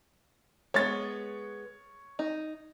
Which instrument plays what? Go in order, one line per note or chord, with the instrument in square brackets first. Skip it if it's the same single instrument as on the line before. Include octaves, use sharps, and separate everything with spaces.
[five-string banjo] G#3 B3 [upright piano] C#5 A6
[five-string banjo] D#4